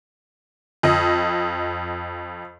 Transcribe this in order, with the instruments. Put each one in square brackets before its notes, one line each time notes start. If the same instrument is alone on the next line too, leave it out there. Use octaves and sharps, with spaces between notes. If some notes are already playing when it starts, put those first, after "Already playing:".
[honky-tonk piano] F2 D#5